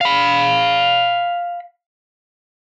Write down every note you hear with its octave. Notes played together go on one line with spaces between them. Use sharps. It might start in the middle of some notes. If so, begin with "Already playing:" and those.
F5 B5